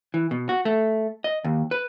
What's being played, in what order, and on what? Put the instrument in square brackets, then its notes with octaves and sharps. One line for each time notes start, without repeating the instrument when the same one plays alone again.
[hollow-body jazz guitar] E3
B2
F#4
A3
D#5
D#2
B4